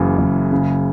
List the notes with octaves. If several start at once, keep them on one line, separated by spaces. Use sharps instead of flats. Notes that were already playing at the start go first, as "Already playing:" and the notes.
Already playing: F#1 C#3 E3
F#1
C#3